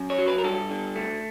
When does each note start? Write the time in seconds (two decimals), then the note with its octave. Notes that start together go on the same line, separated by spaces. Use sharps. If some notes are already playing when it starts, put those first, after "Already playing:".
Already playing: F#2
0.10 C#5
0.18 F#3
0.27 B4
0.38 A#4
0.44 G2 A4
0.70 D3
0.96 A3